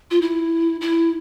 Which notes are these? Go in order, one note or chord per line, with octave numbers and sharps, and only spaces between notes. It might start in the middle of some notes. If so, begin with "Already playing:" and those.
F4
E4
E4